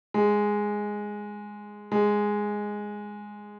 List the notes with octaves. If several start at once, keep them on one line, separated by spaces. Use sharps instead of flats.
G#3
G#3